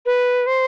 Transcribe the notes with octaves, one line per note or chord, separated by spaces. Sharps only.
B4
C5